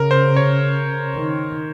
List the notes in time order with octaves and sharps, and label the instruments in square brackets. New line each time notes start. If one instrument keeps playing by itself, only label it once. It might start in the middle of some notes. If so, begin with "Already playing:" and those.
Already playing: [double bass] C#3 [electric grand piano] A#4
[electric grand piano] C5
C#5
[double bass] D#3